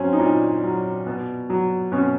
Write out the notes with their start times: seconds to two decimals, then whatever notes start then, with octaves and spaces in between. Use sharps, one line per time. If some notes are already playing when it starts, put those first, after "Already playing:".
Already playing: F#3 C4 C#4
0.13 D#4
0.20 A#2 D4
0.64 F#3
1.07 B2
1.50 F#3
1.92 B2 C#4